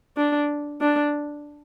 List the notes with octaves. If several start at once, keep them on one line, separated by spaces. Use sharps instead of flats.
D4
D4